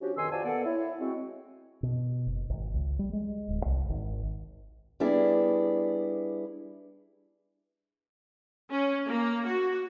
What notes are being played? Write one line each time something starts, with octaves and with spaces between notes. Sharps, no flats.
F3 C#4 D4 F#4 G4
F2 B2 D#3 G#5 C6 E6
F4 F#4 C5 D5 G#5 A5
B2 A#3 B3 A4 D5 F#5
E4 C#5
G#3 C4 F#4
B2
F#1
G#1
C#2
G3
G#3
D1
C2
G#1
G3 B3 D4 E4 G#4
C#4
A#3
F#4